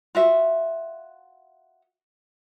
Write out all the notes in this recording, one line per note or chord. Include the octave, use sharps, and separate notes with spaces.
F4 F#4 E5